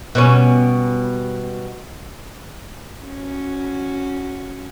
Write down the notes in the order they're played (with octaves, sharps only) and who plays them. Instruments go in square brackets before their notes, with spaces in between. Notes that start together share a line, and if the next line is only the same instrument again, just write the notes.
[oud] B2 G3 C#4
[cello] C#4 F#4